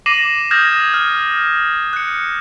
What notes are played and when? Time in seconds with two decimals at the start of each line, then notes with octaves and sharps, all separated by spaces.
0.06 D6 A#6 C7 D#7 E7 F#7
0.51 D#6 F6 G6 G#6 A#6 E7
0.94 F6
1.93 F#6 C#7